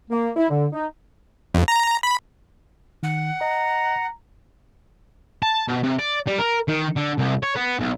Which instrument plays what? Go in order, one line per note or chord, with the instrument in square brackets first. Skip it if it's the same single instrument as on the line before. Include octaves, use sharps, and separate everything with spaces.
[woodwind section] A#3
E4
D3
D#4
[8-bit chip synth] F2
A#5
B5
[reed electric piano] D#3 [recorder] F#5
[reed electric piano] D#5 [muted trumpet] A#5
[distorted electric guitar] A5
B2
C3
D5
G3
A#4
D#3
D3
C2
C#5
B3
B1